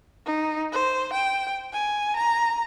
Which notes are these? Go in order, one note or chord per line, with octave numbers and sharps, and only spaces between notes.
D#4
C5
G5
G#5
A#5